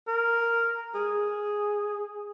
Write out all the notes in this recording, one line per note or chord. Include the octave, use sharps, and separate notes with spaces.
A#4
G#4